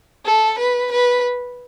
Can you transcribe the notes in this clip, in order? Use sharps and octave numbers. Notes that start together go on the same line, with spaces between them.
A4
B4
B4